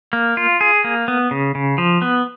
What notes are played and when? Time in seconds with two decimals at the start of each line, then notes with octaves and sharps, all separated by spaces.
0.13 A#3
0.37 F4
0.61 G#4
0.84 A#3
1.08 B3
1.31 C#3
1.55 C#3
1.78 F3
2.02 B3